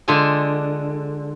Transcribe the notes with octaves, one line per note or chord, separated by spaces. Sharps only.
D3 G#3 F4 A4 G#5